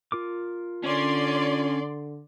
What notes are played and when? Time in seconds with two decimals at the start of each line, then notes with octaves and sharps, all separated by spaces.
0.12 F4 A#4 D6
0.84 D3 C#4 C#5 D5 C6